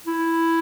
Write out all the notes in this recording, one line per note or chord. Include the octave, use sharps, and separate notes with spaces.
E4